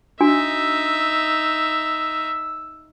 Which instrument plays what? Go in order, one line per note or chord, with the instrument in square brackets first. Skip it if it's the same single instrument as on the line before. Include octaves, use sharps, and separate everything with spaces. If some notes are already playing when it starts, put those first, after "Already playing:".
[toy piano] D4 F#4 G#5 [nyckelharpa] D#4 E5 [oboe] E6